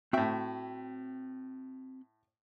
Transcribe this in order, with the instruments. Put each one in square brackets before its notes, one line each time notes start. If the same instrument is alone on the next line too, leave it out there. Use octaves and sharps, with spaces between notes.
[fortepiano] A2 E5 [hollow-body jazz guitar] C4 F#4 G5